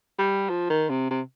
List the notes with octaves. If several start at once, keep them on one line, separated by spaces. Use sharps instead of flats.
G3
F3
D#3
C3
C3